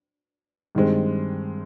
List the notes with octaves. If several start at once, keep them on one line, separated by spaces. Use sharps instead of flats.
G2 D#3 G#3 C4